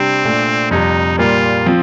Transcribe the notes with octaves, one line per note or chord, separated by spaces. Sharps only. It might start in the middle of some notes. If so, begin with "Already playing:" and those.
Already playing: C3 G3 C4 D4 G4
A#2 A3 D4
F2 C3 G3 D#4
A#2 G3 A#3 F4
F3 C4